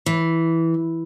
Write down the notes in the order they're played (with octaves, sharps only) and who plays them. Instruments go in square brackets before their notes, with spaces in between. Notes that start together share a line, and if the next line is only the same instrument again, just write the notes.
[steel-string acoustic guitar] E3